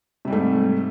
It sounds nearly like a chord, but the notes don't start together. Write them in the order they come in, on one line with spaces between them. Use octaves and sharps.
C3 G3 G#2 A3